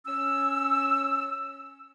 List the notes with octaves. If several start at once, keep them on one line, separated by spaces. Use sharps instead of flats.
C#4 E6